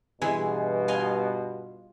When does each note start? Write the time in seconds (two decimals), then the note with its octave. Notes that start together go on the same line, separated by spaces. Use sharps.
0.22 G2 B2 E3 G#3 E4
0.88 F4 D#5 G#5